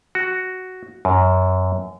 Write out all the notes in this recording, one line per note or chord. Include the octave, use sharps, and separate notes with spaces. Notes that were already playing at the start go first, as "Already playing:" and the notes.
F#4
F#2